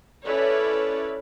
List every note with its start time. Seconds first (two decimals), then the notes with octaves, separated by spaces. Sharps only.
0.24 C#4 E4 A4 B4 C#5 D5